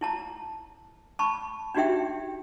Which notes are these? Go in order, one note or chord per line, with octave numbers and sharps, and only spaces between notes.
E4 A5 A#5
A5 B5 C#6
D4 D#4 F#4 G4 E5 G5